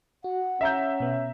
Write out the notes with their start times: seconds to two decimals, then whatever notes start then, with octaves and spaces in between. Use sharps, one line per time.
0.24 F#4 F#5
0.61 C#4 E5 A#5 G6
1.00 B2 B3